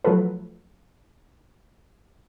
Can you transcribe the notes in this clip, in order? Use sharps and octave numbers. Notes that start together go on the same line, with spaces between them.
F3 F#3 A3 F4 A4 B4